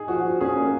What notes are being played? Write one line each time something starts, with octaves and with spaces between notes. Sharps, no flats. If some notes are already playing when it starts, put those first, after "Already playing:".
Already playing: D#4 G#4
F3 F#4
F3
C#4 G#4
A#3